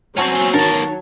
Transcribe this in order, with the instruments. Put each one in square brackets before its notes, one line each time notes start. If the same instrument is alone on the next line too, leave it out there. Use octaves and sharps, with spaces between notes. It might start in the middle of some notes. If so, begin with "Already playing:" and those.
[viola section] F#3 C#5 [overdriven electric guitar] C4 C#4 [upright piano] F#5 A5 C#6 [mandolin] G#5
[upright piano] D#3 [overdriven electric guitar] B3 A#4 [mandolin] A5